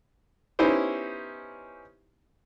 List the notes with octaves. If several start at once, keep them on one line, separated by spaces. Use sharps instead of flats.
B3 C#4 D#4 E4 G4 C5